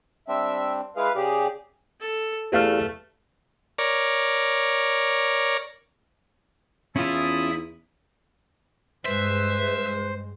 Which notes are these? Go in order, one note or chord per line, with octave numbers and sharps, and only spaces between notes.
G3 C4 D4 E5
G#3 E4 G#4 B4 F5
C#3 G4 G#4 D5
A4
E2 A3 G4 F5 F6
A#4 C#5 D5
E2 C#4 E4 F4 A4 B5 D#6
G2 G#3 B4 C5 E5